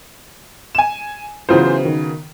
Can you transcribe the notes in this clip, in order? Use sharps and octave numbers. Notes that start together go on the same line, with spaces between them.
G#5 E7
C#3 E3 F#3 B3 F4 C5
D#3